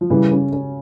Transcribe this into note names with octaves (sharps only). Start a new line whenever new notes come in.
F3
C#3 E3 G3
C#4
C#4